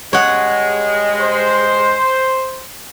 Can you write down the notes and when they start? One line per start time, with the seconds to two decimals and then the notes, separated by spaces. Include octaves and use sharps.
0.13 G2 G#3 C#5 F#5
1.19 C5